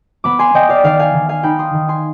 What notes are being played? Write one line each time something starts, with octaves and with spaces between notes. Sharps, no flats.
B3 B5 D6
G#5 C6
B3 D#5 G5
D5 F5
D#3 D5 F5
F5 G#5
D#3
F5 G#5
D#4 G5 B5
C6 D#6
D#3
G#5 C6